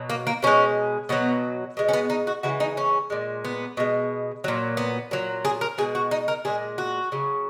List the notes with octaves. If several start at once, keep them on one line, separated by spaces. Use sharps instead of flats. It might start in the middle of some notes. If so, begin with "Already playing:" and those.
Already playing: B2 F#3
A#3
A#3
B2 G#3 C#4
B2 F#3 B3
B2 G#3
C#4
B3
D#4
F#4
C#3 E3 G#3 F#4
D#4
C#4
A#2 G#3
B3
B2 G#3
A#2 F#3
B3
A#2 F#3
G#4
A#4
B2 G#3 G#4
F#4
D#4
A#4
A#2 G#3 G#4
F#4
C#3 F#3